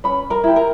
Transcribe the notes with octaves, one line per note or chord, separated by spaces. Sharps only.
C#4 B4 B5
A#4 A#5
E4 G4
A#4 A#5